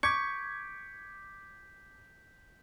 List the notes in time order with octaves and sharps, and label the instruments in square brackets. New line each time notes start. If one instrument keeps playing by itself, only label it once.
[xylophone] C#6 [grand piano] D6 G#6 C#7 [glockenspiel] G6 B6